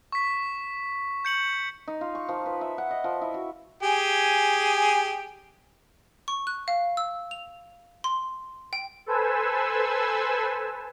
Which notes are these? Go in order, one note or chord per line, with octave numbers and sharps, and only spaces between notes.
C#6 B6
G6 C#7 F#7
D#4
F4
C#6
F3
B4
E5
F#5
D#5
F3
E4
F#4
G4 G#4 G#5
C#6
F#6
F5
E6
F7
C6
G5
A4 B4 C5 G#5 E6